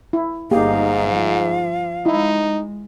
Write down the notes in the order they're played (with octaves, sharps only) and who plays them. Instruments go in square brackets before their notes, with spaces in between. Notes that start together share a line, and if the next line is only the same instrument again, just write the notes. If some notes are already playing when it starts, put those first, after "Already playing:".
[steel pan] E4
[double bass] G1 D#4 [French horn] G#2 [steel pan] A#3 G4 G#4 [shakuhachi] F5
[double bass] F3
[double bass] G#3 [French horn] D#4 [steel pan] E4